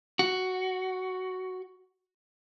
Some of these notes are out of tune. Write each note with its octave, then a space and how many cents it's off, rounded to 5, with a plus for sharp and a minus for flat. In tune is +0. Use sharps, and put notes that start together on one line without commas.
F#4 +5